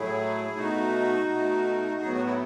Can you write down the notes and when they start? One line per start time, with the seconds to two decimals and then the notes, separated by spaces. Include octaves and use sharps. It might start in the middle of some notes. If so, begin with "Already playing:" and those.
Already playing: A2 F#3 A3 E4 G#4
0.56 B2 A3 D#4 F#4
1.29 B2
1.34 A3
2.01 A2 F#3 B3 G#4
2.12 F#4
2.24 E4